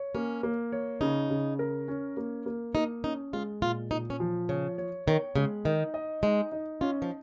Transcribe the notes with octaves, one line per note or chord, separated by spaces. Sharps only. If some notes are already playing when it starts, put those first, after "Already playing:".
Already playing: C#5
A#3 C#4
A#3
C#5
C#3 D#4
C#3
A#4
C#4
A#3
A#3
A#3 D#4
C#4 D#4
G#3 F4
A#2 F4
A#2 D#4
C#4
F3
C#3 C#5
C#5
D#3 C#5
C#3 G#3
D#3 D#4
D#5
G#3 D#4
D#4
C#4 F4
F3